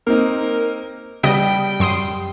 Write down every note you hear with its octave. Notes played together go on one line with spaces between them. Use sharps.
A#3 C4 D#4 A#4
C#3 G3 B3 D#5 G5
F#2 C6 D#6